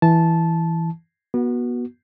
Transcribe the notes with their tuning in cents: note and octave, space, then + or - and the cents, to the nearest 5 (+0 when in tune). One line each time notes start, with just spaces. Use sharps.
E3 +0 A5 -15
B3 -30 F#4 +0